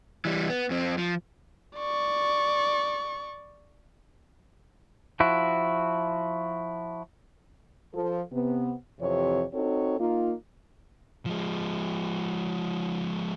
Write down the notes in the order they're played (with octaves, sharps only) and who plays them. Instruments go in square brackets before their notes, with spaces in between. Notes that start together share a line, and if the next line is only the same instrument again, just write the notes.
[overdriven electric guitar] E3 G3
B3
F2 C4
F3
[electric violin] D5 C#6
[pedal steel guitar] F3 E4 F#4
[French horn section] F3 A4
C3 B3
F2 C3 E3 G4 C#5
C4 D#4 F#4 A4 C#5
A#3 D#4 F4
[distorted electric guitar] F3 G#3